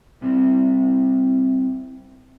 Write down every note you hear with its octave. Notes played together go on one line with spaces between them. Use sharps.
C2 C3 G3 C4 E4